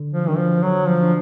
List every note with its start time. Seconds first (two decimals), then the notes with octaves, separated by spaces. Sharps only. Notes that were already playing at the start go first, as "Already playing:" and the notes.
Already playing: D3
0.12 F3
0.24 D#3 F#3 D4
0.37 F3
0.63 D3 F#3
0.88 F3
1.01 F#3 D4